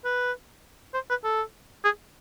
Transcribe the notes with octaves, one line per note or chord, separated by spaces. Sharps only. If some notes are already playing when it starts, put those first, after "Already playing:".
B4
C5
B4
A4
G#4